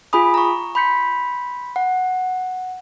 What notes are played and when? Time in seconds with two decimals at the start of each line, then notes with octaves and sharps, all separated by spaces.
0.13 F4 G#4 G#5 B5 D#6
0.34 A#5 C#6
0.75 B5 C6 G6 B6 C#7
1.76 F#5